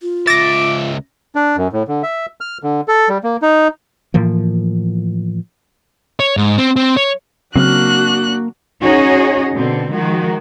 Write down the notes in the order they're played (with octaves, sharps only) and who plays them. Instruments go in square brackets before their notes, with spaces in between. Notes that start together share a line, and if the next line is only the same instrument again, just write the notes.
[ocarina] F4
[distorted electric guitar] C#2 E5 [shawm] D6 [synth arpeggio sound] A6 A#6
[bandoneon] D4
F#2
A2
D3
E5
F6
D3
A4
G3
A#3
D#4
[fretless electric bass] A2 E3 F3 A#3
[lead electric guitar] C#5
G#2
C4
C4
C#5
[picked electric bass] C#3 F#3 C4 [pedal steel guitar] A#3 F6 [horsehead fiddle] D4 F#4 [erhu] F#6
[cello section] C#4 D#4 F#4 G#4 C#5 D#5
B2 D3 C4
D#3 F3 G#3 F#4